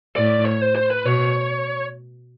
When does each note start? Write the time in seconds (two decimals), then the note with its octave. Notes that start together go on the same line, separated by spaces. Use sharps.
0.16 A2 D5
0.45 C#5
0.61 C5
0.76 C5
0.90 B4
1.05 B2 C#5